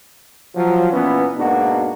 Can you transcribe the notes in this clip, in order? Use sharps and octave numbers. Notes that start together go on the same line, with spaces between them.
F3 F#3
A#2 E3 B3 C#4
G#2 B2 A#3 D4 F#4